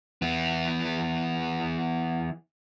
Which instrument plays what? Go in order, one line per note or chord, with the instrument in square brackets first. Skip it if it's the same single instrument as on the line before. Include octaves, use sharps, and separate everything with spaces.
[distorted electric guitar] E3 B3